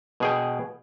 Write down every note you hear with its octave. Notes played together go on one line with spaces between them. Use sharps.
B2 G#4 G5